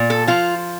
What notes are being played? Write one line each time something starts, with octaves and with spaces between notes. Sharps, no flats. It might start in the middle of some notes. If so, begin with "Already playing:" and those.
Already playing: A#2
A4
F3 F4